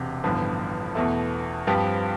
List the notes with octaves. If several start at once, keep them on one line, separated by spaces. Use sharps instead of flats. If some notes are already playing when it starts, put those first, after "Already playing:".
Already playing: E1 C3
A1 G2 D3 F3 B3
E2 B2 A3
G2 F3 C4 G4 B4